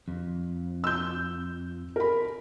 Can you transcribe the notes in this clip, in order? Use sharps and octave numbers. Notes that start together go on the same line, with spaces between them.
F2
E6 G6
A#4 B5